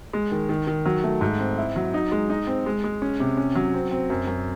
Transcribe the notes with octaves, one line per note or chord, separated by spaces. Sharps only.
G#3
D#3
D#3
D#3
F#3
A3
G#2
C4
E4
F#3
D#4
G#3
D#4
C4
G#3
G#3
C#4
C3
C#4
F#3
C4
C4
F#2
F#2